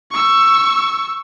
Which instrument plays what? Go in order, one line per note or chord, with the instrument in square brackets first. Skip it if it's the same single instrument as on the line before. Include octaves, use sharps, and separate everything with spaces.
[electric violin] C#6 E6